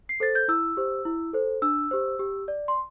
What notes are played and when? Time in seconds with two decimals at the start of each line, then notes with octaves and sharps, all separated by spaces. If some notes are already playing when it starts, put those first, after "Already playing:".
0.09 C7
0.20 A4 C5 A6
0.35 G6
0.48 E4 E6
0.77 G4 C5
1.05 E4
1.33 A4 C5
1.62 D4 E6
1.91 G4 C5
2.19 G4
2.48 D5
2.68 C6